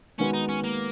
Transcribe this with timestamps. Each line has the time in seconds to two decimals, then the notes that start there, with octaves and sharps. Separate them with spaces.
0.19 D#3 G#3 B3 C#4 F#4 B4
0.34 D#4
0.49 C#4
0.64 A#3